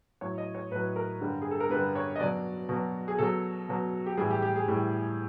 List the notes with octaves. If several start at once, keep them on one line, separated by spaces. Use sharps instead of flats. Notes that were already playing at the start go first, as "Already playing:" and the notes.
A2 F#3 C#5
D#5
C#5
A2 F#3 B4
A#4
G2 D3 G3
G#4
A4
A#4
G2 D3 G3 B4
C#5
D#5
B2 F#3 D5
B2 F#3
G#4
B2 F#3 A4
B2 F#3
G4
A2 E3 G3 G#4
G4
G4
G#4
A2 E3 G3